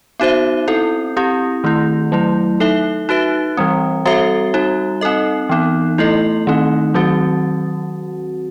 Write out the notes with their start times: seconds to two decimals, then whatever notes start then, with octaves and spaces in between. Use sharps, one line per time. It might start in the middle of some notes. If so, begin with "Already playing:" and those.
0.20 B3 D#4 F#4 C5 E5
0.68 C4 E4 A4
1.17 C4 E4 G4
1.64 D#3 A3 E4
2.12 F#3 A3 E4
2.60 D#4 A4 E5
3.09 D#4 F#4 B4 E5
3.57 E3 G3 C4
4.06 G3 C4 F#4 A4 E5
4.54 G3 D#4 F#4
5.01 C4 D#4 A4 D#5
5.49 E3 B3 D#4
5.98 A3 E4 A4 D#5
6.47 D#3 A3 C4 D#4
6.94 D#3 F#3 C4 F#4